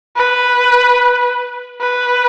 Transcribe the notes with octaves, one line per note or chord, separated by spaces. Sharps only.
B4
B4